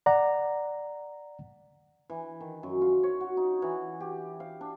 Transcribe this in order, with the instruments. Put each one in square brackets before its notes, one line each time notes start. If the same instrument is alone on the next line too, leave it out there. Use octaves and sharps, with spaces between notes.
[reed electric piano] D5 F#5 A#5
[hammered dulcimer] E3
D#3
F#2
F4
C#5
F#4
D#4
E3
G4
F5
D4